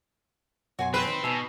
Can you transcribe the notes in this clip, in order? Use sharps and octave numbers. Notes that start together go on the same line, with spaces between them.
F#2 B2 F#4 C#5 G#5 C6
C4 B4 G#5 C6
D#3 C#6
B2 D#4 E5 G#5 A5